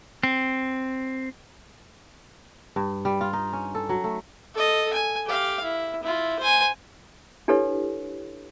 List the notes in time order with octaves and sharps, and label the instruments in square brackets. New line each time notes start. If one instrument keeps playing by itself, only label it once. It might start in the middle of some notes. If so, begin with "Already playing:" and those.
[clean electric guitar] C4
[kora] G2
G3
F4
D#4
C#4
A4
F#3
A3
[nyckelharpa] A4 D#5
G#5
G4 F5
E4
E4 F4
C5 G#5
[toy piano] D4 E4 G4 A4 B4 C#5